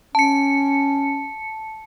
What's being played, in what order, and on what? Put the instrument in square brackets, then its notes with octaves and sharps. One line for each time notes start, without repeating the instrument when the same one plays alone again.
[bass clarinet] C#4 [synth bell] A5 C#7